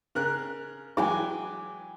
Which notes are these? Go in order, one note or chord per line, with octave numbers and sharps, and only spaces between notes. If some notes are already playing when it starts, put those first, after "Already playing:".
C#3 A#4 F#6
E3 F#3 G#3 G5 G#5 D6